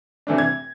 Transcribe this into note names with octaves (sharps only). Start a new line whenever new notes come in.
C3 E3 A3 D4
G#6